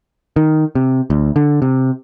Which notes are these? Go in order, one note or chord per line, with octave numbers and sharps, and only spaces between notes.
D#3
C3
D2
D3
C3